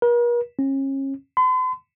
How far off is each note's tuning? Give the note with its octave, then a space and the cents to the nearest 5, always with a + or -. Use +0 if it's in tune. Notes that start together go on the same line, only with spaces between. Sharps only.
A#4 +45
C#4 -35
C6 -45